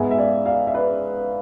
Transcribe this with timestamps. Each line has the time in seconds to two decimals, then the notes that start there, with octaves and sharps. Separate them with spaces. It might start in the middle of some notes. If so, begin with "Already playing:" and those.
Already playing: G#2 G#3 B3 E5 G#5
0.11 E5
0.18 D5 F5
0.46 D5 F5
0.67 E5
0.74 B4 D5